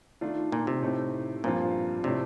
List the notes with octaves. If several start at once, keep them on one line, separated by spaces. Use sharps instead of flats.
D#3 A3 D4 F4
A#2
C3
A2 A3 C4 D#4
G2 A#2 F3 C4 F4
A2 C3 A3 D4